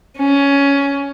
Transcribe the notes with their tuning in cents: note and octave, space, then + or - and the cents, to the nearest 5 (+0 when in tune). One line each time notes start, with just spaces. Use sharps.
C#4 +15